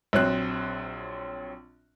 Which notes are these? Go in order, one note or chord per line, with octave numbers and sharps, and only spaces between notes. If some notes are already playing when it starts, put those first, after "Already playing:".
A#1 F#3 C4 F#6